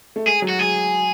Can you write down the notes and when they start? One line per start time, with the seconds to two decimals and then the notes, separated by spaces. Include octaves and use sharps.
0.16 A3
0.26 G#3 G#4
0.42 F#3
0.48 F#4
0.59 G#3 G#4